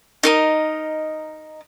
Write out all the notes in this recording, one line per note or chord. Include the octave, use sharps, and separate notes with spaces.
D#4 A#4 D#5